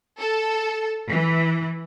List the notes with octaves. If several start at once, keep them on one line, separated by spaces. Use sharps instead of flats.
A4
E3